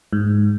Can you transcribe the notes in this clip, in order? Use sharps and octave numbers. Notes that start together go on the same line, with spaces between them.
G#2